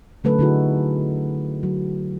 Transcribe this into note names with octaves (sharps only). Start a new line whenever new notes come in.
D3 F#3 A3 C#4 A4 B4
D3 A3 D#4 E4 F#4 G#4
F#3